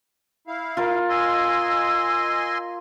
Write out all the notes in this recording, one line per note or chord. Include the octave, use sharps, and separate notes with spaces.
E4 F5
F4 A#4
D#5 G#5 C6 E6